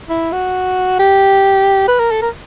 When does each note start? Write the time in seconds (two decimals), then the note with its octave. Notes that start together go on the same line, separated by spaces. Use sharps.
0.09 E4
0.32 F#4
0.99 G4
1.88 B4
1.99 A#4
2.11 A4
2.22 A#4